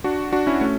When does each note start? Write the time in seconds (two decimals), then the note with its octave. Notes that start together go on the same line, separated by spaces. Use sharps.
0.04 D4 F#4
0.33 D4 F#4
0.47 C#4 E4
0.61 A3 C#4